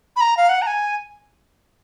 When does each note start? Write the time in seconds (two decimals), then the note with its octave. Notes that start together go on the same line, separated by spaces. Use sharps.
0.16 B5
0.21 A#5
0.37 F5
0.49 F#5
0.62 A#5
0.67 G#5